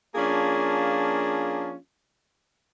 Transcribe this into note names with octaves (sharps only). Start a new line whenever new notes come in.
F3 A#3 C#4 D4 F4 G#4